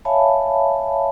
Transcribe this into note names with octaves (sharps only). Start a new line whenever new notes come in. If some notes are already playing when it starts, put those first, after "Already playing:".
C#5 E5 F5 G#5 A5 B5